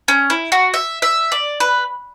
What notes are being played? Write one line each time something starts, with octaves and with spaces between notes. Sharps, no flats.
C#4
E4
F#4
E5
E5
D5
B4